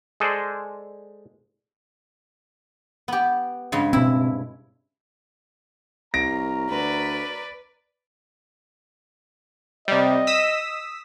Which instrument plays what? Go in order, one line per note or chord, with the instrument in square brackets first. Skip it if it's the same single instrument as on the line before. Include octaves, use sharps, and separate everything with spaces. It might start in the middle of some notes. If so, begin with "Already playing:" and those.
[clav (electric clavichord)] G#3 G#4 A4 C5 D5
[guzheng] B3 G4
G2 C#3 G#3
[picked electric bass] B2 C4 [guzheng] E4
[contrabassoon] C2 [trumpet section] A#4 C#5 A#5 [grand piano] A#6 D7
[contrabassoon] D2 [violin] B4 D5
[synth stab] C3 G3 [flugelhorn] D#5
[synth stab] D#6 E6 B6